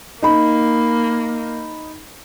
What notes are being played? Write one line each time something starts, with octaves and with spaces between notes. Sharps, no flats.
A#3 D#4 B5